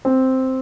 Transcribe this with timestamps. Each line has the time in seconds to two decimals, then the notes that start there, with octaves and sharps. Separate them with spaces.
0.05 C4